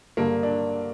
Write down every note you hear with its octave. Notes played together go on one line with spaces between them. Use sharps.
G2 D3 A#3
D4